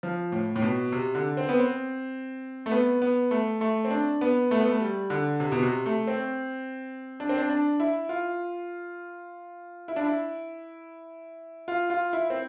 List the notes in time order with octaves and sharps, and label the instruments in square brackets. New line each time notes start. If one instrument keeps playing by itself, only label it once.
[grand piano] F3
A2
A2
B2
C3
D3
C4
B3
C4
A3
B3
B3
A3
A3
C4
D4
B3
A3
B3
A3
G3
D3
C3
B2
C3
A3
C4
D4
C4
D4
D4
E4
F4
E4
D4
E4
F4
F4
E4
C4